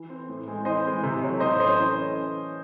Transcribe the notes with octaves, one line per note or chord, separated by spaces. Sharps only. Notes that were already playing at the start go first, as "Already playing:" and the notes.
Already playing: E3
C4
A2
G#3 C4
E3 C5 D#5
G#3 C4
C3
F#3 A3
A2 C5 D#5
F#3 C#4 C5 D#5
E3
A3 C#4